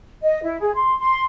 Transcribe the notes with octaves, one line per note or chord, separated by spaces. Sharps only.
D#5
E4
G#4
C6
C6